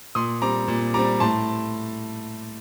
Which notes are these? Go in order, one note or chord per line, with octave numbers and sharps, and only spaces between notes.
A#2 C6 D#6
G3 C4 A#5 D6
A#2
G3 C4 A#5 D6
A2 A5 C6